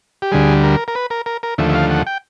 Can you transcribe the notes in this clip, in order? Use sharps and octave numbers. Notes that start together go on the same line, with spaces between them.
G4
D2 D3 G3 G#4
A#4
A#4
B4
A#4
A#4
A#4
D#2 D3 F3 A3 E5
E5
F5
F#5
G5